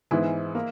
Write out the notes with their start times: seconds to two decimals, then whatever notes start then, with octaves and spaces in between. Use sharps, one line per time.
0.11 G#2 E3 G#3 B3 E4
0.55 A#3